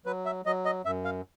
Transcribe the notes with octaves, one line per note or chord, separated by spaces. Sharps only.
F#3 B4
E5
F#3 D#5
D#5
F#2 E5
F5